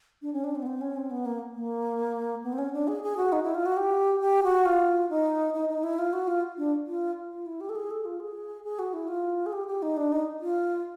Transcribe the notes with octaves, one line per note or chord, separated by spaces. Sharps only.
D4
C#4
D4
C4
B3
C4
C#4
C4
B3
A#3
A#3
B3
C4
C#4
D4
G#4
G#4
F#4
D#4
E4
F4
F#4
G4
G4
F#4
F4
D#4
D#4
D#4
E4
F4
F#4
F4
D4
F4
F4
E4
G4
A4
G#4
A4
F4
G#4
G#4
F#4
E4
F4
G#4
G4
G4
D#4
D4
D#4
F4